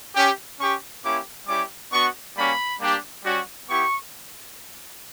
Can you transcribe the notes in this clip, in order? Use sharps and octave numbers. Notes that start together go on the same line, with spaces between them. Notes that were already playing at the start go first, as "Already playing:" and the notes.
C#4 G4
C#4 G4 C#6
A#3 C#4 E4 G4 D6
G3 C#4 E4 G4 D6
B3 D4 F#4 C#6
G3 A#3 C#4 F#4 B5
G3 A#3 D4 G4
G3 C#4 F#4
B3 E4 G4 C#6